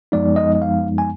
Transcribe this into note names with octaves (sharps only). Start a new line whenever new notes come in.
F#2 F3 G#3 B3 D#4 D5
D#5
D#5
F5
G#5